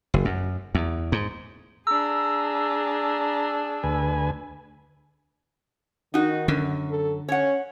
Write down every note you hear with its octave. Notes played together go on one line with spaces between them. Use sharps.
F#1
F#2
E2
G#2
D4 G#4 A#5 E6
D2 B4 G#5
D#3 D#4 F#4
F#2 D3
A4
C#4 C#5 F#5